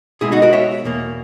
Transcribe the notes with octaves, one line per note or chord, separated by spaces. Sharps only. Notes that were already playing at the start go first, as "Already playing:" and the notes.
B2 G#3 B3 E4 G#4
D#4 F#4
F#4 A#4
C#5 E5
E2 B2 A#3